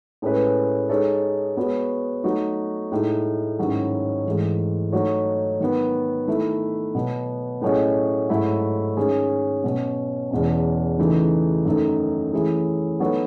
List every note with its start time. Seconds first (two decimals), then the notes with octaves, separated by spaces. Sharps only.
0.22 A2 G#3 C#4 G#4 B4
0.89 G#3 D#4 A4 C#5
1.57 G#3 B3 F#4 C#5
2.24 F#3 A3 D#4 F#4
2.92 A2 G#3 D#4
3.59 G#2 D#3 F#3 C#4 E4
4.26 G#2 E3 A3
4.92 F#3 A3 D#4 F#4 C#5
5.60 D#3 F#3 B3
6.28 D#3 A3 E4
6.95 B2 F#3 B3
7.61 A2 F#3 C#4 G#4 D#5
8.29 G#2 F#3 A3 E4 A4
8.96 D#3 G#3 C#4 G#4
9.64 B2 F#3 C#4
10.31 E2 B2 G#3 C#4
10.98 C#3 E3 A3 D#4
11.65 F#2 D#3 A3 D#4 A4
12.33 E3 A3 C#4 E4 G#4
13.00 F#3 B3 D#4 A4 C#5